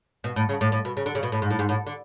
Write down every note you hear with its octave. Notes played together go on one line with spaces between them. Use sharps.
B2
A2
C#3
A2
A2
B2
C#3
D3
C#3
B2
A2
G#2
A2
G#2
A2
D3